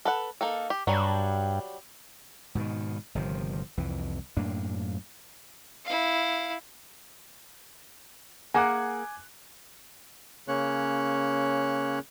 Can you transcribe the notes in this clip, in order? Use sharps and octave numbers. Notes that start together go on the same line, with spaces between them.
A4 B4 F#5
A#3 D#4 A4
G4
G2 F#3 G3 D4
G#2 B2 D3 D#3
G1 C3 D#3 F3
C2 F2 E3
F#2 A2 A#3 D4
E4 F5
A#3 G#4 F#5 G#5 D6 F#6
C#3 A#3 C#4 C#5 F#6